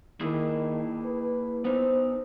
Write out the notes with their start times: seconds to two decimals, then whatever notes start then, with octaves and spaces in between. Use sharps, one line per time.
0.21 D#3 A#3 E4 G#4
1.05 B4
1.65 B3 D#4 C5